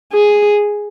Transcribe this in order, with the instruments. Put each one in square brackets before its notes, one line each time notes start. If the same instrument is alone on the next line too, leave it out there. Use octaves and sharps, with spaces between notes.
[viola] G#4